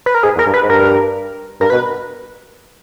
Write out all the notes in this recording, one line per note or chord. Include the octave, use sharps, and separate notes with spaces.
B4
A#4
G#2 G#4
E2
A#4
G2
B4
G#2
G2 A#4
G2 A#4
B2 B4